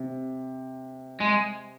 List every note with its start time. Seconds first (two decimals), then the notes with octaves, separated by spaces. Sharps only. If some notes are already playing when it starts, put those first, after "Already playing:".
Already playing: C3
1.21 G#3